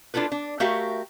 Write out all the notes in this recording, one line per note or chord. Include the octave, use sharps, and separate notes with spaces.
D4 E4 F4 A4 B4
D4
A3 F#4 G4 A#4 E5 F5